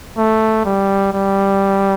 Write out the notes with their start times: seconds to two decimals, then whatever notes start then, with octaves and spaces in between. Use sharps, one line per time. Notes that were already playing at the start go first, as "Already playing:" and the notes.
0.17 A3
0.65 G3
1.13 G3